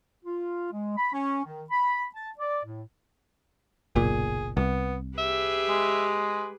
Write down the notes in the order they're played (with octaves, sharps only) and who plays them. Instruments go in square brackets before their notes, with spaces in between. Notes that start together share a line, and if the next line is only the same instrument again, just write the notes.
[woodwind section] F4
G#3
B5
C#4
D#3
B5
A5
D5
A2
[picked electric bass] F#1 B1 A#2 [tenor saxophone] G#4
[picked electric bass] C2 [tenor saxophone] B3
[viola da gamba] G4 G#4 B4 [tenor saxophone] E5
[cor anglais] G#3